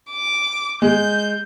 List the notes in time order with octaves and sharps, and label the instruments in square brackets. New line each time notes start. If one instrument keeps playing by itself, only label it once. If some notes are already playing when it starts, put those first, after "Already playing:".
[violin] D6
[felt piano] G#3 [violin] G6